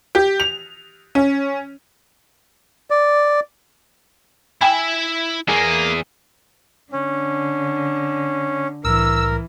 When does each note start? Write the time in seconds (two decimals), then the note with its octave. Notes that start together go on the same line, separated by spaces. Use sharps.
0.15 G4
0.40 F7
1.15 C#4
2.90 D5
4.61 E4 E5 G5 G#5 B5
5.49 E2 A#3 G#4
6.93 D3 C#4
8.85 C2 A2 E3 A#4 E6